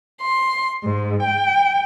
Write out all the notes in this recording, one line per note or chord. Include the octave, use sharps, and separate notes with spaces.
C6
G#2
G5